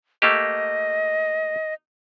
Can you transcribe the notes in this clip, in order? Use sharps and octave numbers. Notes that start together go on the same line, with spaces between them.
A3 A#3 G4 D#5